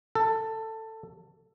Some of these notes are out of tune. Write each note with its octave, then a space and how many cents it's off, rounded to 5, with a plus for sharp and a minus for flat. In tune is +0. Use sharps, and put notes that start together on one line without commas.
A4 +15